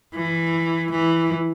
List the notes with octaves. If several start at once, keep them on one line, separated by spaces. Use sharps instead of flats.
E3
E3